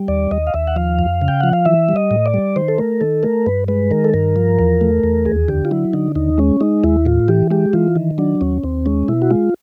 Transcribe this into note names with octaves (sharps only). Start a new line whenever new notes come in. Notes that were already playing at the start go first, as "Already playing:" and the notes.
Already playing: G3
D#2 D5
D#2 D#5
F5
D#2 E5
F#5
F3 F5
F2
C#3
G5
F3 F#5
F5
E3 E5
G3
D#5
A2
D5
G3
D#3 C5
A4
A3 A#4
D#3 A4
A3 A#4
G2 B4
G#3 B4
D#3 A#4
A4
G2 A#4
F3
E2
A3
E2
D#2 G#4
D3 G4
F4
F#3 E4
D3 D#4
D#2 D#4
G#3 C#4
G#3 D#4
D#2 E4
A2 F4
E3 G4
G#3 G4
E3 F4
D#3
F#3 D4
D#2 C#4
D#2 C4
G#3 C#4
B2 E4
F#4
G#3 F4